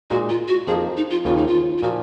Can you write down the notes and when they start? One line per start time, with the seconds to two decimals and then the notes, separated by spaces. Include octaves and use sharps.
0.10 A#2 G#3 D#4 F#4
0.29 F4
0.48 F#4
0.67 F2 F3 A#3 D#4 G#4
0.97 D#4
1.10 F4
1.25 D#2 C#3 F3 A#3 F4
1.37 D#4
1.47 F4
1.78 F4
1.83 A#2 F3 A#3 F#4